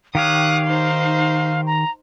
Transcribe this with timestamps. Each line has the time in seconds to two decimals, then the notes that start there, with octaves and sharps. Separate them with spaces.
0.15 D#3 G4 C#5 F5 D#6 F#6
0.66 D#4 C5
1.66 A#5